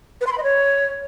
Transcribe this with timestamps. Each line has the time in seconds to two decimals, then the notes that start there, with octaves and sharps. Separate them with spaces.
0.21 B4
0.27 C6
0.32 B5
0.38 D#5
0.43 C#5